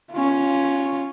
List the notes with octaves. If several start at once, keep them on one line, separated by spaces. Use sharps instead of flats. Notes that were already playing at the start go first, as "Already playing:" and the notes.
C#4 F4